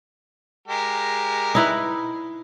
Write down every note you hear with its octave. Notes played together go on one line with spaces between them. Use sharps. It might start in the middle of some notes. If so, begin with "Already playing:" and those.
G#3 G4 A#4
D#4 E4 B4